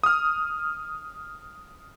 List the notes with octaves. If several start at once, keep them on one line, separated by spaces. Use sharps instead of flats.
D#6 F6